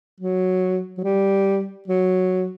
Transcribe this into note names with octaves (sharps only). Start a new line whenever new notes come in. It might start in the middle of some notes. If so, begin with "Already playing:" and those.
F#3
F#3
G3
F#3